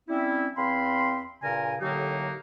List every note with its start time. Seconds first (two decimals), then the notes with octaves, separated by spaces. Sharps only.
0.09 G3 C4 C#4 E4
0.57 E2 C4 F5 B5 C6
1.43 G2 A#2 C#3 A#4 G#5
1.81 A2 D3 F#3 A#3 D#4 G4